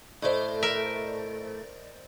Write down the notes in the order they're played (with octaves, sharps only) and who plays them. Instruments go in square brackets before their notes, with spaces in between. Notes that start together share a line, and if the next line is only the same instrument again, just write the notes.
[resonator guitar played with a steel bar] A2 A3 [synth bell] C5 D5 D#5
[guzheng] A#4 E5